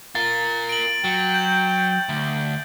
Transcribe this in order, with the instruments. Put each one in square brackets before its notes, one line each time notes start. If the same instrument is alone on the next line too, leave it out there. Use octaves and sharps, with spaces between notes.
[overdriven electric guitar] F4 A#4 [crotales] A6
[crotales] D7 F#7
[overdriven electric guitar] F#3 [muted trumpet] G5
[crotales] G6
[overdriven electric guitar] D2